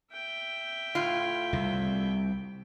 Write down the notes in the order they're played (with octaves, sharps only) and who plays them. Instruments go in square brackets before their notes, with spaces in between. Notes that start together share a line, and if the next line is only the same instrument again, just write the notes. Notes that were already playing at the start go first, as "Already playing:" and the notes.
[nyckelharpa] E5 G5
[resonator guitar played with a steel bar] A2 F4
[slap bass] C2 C3